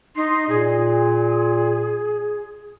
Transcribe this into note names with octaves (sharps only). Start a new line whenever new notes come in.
D#4 C6
A#2 G#4